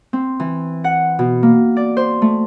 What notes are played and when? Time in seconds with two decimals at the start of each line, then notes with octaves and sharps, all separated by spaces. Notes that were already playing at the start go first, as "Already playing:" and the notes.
0.13 C4
0.40 E3
0.84 F#5
1.19 B2
1.43 A#3
1.77 D5
1.97 C5
2.22 A3